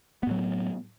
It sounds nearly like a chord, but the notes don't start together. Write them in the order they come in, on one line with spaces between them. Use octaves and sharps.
B3 A2 F#3